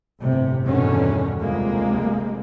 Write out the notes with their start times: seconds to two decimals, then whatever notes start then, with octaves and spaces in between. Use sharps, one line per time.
0.21 G1 A2 C3
0.64 E2 G2 B2 D3 D#3 C#4
1.39 F1 D2 G3 G#3 A#3